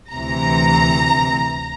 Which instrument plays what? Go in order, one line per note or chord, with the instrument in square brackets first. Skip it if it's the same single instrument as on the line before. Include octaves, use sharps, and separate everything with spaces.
[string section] D2 C3 E3 A#5